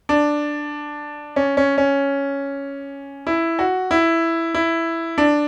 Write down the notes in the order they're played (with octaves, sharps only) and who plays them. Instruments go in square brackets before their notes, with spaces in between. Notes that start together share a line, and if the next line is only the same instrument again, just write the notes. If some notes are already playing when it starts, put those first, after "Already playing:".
[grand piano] D4
C#4
C#4
C#4
E4
F#4
E4
E4
D4